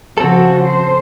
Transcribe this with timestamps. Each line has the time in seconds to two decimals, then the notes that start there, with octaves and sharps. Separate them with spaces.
0.18 C#3 F3 C4 F#4 A4
0.67 C5